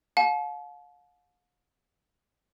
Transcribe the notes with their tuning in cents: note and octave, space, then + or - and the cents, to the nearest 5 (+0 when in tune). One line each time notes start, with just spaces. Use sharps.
F5 +45 A5 -40